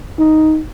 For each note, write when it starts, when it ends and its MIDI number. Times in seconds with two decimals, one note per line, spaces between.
0.19 0.61 63